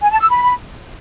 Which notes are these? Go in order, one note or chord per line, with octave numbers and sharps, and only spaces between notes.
G#5
A5
E6
B5